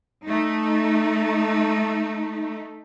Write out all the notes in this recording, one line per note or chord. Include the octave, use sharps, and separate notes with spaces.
A3 D#4